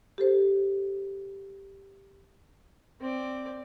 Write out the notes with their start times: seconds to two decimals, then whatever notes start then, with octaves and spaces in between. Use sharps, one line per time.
0.18 G4 A4 C5
3.01 C4 D5